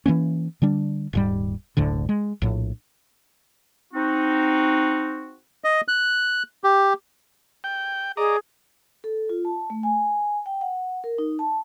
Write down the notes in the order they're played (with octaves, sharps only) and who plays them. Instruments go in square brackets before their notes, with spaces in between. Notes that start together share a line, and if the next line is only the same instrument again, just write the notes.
[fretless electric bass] E3 F#3 A#3 C#4
D3 G3 D4
D#1 G#2 G3
F#1 D2 A2 D3
G#3
A#1 A2
[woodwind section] C4 D#4 F#4
[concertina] D#5
F#6
G4
[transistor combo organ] G5
[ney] G#4 [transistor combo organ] D5 D#5 A#5
[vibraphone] A4
F4
A5
A3
G#5
G5
F#5
A#4
D#4
A5